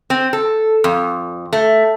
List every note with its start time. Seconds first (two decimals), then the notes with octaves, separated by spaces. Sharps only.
0.10 C4
0.33 A4
0.84 F2
1.53 A3